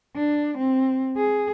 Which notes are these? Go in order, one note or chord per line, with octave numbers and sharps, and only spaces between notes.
D4
C4
G#4